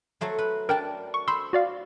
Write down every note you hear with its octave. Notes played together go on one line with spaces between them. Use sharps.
F#3 A3 C5
B4
D4 A#4 G5 A5
C#6
C5 B5 C6 E6
F#4 D5 F5